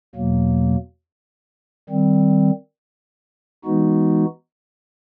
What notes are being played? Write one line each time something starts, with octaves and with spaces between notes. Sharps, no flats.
E2 B2 F#3 A#3
D#3 G3 C4
E3 G#3 B3 D#4 F#4